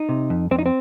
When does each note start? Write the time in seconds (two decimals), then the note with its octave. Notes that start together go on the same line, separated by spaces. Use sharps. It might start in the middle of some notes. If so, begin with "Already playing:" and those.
Already playing: D#4
0.09 C3
0.30 F2
0.51 F2 C4
0.59 D#4
0.66 C4